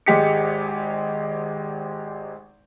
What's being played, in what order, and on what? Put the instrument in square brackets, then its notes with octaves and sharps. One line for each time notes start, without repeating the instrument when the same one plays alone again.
[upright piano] G#1 G#3 G4 B6 C#7